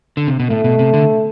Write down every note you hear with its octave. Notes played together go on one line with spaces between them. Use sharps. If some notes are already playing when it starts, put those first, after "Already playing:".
D3
C3
B2
A2 A3
B2
C3
D3